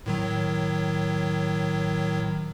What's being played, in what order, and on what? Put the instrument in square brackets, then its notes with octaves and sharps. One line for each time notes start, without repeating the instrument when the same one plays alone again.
[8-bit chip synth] A2 D#3 F#3